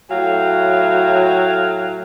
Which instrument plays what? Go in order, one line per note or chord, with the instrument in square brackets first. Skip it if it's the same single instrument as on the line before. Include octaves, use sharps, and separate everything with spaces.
[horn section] A2 F#3 F5 G5